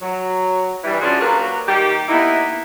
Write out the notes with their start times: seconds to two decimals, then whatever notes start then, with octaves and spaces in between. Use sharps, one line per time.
0.01 F#3
0.84 G2 E3 G3
1.01 C#4 D4 F4 F#4 G#4 D5
1.20 F#3 A#3 F#4 G4 A#4 B4
1.66 D#3 G3 A#3 D#4 G4
2.09 A#3 B3 D#4 E4